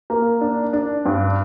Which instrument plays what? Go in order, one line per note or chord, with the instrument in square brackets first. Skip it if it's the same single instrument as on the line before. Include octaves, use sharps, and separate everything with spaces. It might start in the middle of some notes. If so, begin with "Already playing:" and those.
[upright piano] A#3
D4
D4
G2